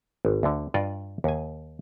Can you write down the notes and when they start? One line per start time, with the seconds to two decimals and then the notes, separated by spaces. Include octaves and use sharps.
0.25 G#1
0.43 D2 D3
0.74 G2 F4 D5 D#5
1.24 D#2 G#5